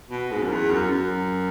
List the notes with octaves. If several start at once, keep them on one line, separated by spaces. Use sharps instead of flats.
B2
G#2
F#2
E2
F#2
F#2